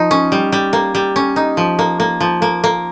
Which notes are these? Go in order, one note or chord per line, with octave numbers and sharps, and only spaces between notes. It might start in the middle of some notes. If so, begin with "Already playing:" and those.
Already playing: F3 D#4
C#4
G3
G3
A#3
G3
C#4
D#4
F3
A#3
A#3
F3
A#3
A#3